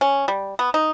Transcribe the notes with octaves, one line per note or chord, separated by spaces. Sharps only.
C#4
G3
B3
D#4